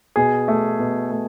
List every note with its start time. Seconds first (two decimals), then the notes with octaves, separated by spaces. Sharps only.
0.16 B2 G#4
0.48 A3
0.80 B2
1.11 A3